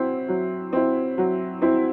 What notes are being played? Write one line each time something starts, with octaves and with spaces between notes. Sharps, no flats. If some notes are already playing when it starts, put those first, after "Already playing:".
Already playing: F#3 C4 E4
F#3
C4 E4
F#3
C4 E4